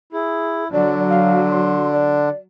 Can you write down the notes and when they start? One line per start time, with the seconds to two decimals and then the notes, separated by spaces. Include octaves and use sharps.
0.13 E4 G#4
0.72 D3 F#3 D4 D5
1.09 F5
1.49 C6
1.93 D5